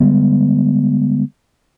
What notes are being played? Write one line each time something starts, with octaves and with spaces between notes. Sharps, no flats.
D3 G3 G#3 B3